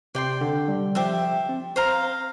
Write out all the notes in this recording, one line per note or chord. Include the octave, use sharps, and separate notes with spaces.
C3 D5 G5 C6
D3
G3
F3 G4 C5 E5
C4
C5 F5 A#5